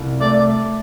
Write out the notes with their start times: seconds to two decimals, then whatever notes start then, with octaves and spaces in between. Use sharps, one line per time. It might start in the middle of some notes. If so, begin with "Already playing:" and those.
Already playing: C2
0.21 A3 D5